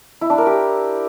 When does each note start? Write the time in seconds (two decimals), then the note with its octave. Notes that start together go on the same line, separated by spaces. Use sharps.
0.21 E4
0.30 D4
0.38 A#4
0.47 G4